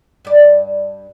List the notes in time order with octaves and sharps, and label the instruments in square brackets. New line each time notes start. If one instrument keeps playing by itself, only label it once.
[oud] G2 D5